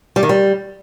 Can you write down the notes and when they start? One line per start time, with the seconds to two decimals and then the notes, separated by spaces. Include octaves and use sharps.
0.16 G3
0.23 D#3
0.29 G3